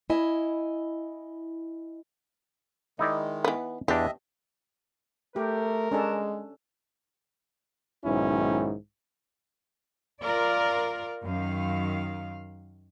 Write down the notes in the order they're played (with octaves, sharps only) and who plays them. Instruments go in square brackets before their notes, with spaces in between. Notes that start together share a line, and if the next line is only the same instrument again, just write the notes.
[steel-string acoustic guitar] E4 D#5 G#5
[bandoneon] D#3 G#3 [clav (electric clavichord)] D#4 E4 D5
[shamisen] E3 B3
[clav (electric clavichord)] E2 D4 [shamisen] G4 [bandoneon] D#5 E5
[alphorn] A3 [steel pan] G4 [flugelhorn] A#4
[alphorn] G#3 [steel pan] C#4 D4 A4
[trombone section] B1 G#2 D#3 C#4 E4
[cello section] F4 A#4 D5
F#2 D#3 F5